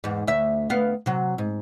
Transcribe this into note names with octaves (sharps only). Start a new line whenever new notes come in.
E2 G#2
D2 E5
D2 B3 F5
C3 F#3
G#2